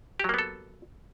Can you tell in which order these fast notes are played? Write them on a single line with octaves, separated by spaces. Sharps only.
G4 F#3 A#3 B3 A4